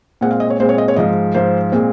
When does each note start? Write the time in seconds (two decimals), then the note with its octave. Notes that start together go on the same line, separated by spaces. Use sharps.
0.21 A#2 G#3 C4 F#5
0.31 F5
0.40 D#5
0.50 C#5
0.60 A#2 G#3 C4 C5
0.69 C#5
0.78 D#5
0.88 C#5
0.96 G#2 F3 G#3 D#5
1.35 G#2 F3 G#3 C5
1.72 A#2 G#3 C4